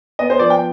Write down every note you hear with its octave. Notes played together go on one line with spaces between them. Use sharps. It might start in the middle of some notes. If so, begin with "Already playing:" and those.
B3 D#5
C5
F3 D5
G5